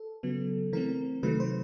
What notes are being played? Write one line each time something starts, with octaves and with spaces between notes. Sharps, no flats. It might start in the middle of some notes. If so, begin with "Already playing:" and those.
Already playing: A4
C#3 F#3 B3
E3 A3 C4 A#4
C3 D#3 F#3 A3 B4
C5